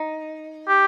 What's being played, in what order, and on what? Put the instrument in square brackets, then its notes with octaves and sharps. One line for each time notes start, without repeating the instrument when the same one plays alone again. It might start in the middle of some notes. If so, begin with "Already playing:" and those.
Already playing: [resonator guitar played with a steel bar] D#4
[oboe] G4